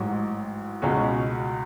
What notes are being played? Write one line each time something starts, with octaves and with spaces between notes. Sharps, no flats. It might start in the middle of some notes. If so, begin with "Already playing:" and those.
Already playing: A1 G#2 F#3
C#2 B2 G#3 C#4 F#4